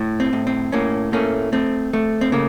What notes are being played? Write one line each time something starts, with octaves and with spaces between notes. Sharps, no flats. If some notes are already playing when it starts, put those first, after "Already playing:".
Already playing: A2
C4
A2
C4
A2 A#3 C#4
A3 A#3 C#4
A3 C4
A3
C4
C#3 A#3